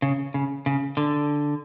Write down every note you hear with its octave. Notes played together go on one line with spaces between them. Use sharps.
C#3
C#3
C#3
D3